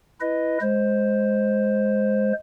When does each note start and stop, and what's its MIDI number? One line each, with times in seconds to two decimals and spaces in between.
0.20 0.58 64
0.20 0.58 71
0.20 0.58 75
0.61 2.33 56
0.61 2.33 72